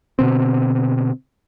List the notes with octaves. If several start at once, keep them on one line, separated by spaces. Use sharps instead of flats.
B2 D3 C4